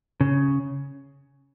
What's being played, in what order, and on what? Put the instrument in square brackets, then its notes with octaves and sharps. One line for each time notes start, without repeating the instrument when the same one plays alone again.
[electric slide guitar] C#3